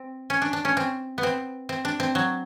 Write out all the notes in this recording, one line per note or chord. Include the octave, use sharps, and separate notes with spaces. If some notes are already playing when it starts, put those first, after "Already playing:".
Already playing: C4
C#4
D4
D4
C#4
C4
B3
C4
C4
D4
C4
F#3